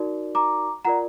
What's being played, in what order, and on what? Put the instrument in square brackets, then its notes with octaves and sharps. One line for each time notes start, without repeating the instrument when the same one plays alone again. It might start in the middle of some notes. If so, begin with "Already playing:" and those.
Already playing: [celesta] D#4 F#4 A#4 D5
A#5 D6
F4 A#4 D5 F#5 A#5